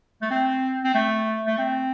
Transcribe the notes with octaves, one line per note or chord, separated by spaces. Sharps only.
A3
C4
C4
A3
A3
C4